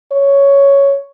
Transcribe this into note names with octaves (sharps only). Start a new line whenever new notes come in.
C#5